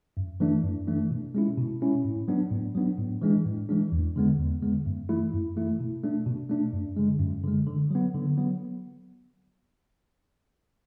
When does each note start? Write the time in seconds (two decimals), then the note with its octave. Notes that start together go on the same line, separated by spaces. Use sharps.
0.17 F#2
0.40 E3 A3 D4
0.64 F#2
0.88 E3 A3 D4
1.10 B2
1.35 G#3 C#4 E4
1.58 B2
1.81 G#3 C#4 E4
2.04 A2
2.28 F#3 B3 D4
2.51 A2
2.75 F#3 B3 D4
2.98 A2
3.21 E3 G#3 D4
3.46 A2
3.69 E3 G#3 D4
3.92 E2
4.16 D3 G#3 B3
4.38 E2
4.62 D3 G#3 B3
4.86 F#2
5.09 E3 A3 E4
5.33 F#2
5.56 E3 A3 E4
5.80 B2
6.03 A3 D4
6.26 B2
6.50 A3 D4
6.73 F#2
6.96 D3 G#3
7.20 F#2
7.44 D3 G#3
7.67 D3
7.91 F#3 B3
8.15 D3
8.38 F#3 B3